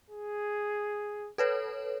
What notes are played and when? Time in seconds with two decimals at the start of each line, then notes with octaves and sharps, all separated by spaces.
0.10 G#4
1.38 A4 B4 C#5